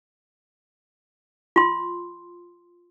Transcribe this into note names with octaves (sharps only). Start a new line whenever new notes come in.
F4 C6